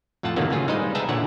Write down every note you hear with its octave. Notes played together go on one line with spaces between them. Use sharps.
F2 A2 F4 F#5 A5
A2 C3 D#3 F#3 A#3 B3
A2 C#3 A3 F4 G#4
G3 G#3 D#4 B4 C5 D#5
G#4 B4 E5 G5 A5 A#5
A#2 D3 E4 C#5 F#5